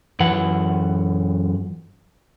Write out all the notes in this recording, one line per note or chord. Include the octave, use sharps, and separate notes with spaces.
F#2 E3 F#5